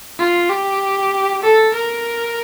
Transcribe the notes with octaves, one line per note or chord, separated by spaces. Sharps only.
F4
G4
A4
A#4